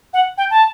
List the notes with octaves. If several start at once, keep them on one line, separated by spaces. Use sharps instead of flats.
F#5
G5
A5